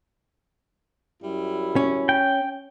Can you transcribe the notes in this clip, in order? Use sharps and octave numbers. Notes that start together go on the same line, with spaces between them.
F#2 G3 E4
C#4
G5